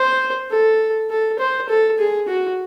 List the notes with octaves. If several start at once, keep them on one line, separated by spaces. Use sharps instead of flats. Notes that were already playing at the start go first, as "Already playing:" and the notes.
Already playing: C5
A4
A4
C5
A4
G#4
F#4